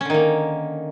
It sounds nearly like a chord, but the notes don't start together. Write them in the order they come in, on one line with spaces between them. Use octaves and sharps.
C#4 D3 D#3 A#3